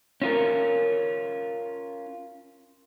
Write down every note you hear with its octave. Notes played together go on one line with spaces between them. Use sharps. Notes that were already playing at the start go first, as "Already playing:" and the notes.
C#4 F4 A#4